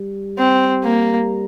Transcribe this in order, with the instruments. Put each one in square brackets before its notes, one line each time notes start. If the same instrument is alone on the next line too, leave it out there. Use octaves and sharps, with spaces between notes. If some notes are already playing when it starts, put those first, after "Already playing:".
Already playing: [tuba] G3
[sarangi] C4
A#3